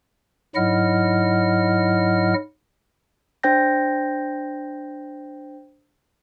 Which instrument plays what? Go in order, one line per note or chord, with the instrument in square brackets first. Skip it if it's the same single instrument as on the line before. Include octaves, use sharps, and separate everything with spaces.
[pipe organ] G#2 F#3 E4 D#5 F#5 F6
[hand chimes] D4 C5 G5 G6 A#6